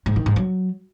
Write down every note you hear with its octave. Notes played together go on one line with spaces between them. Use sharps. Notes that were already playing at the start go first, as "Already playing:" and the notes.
G#2
D#3
G#2
F#3